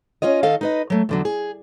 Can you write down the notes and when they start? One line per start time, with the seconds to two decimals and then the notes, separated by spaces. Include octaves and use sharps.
0.22 C#4 F4 C#5 D#5
0.43 D#3 A4 D#5 F5
0.61 D#4 B4 D#5
0.90 F#3 A3
1.09 E2 D3 F#3
1.25 G#4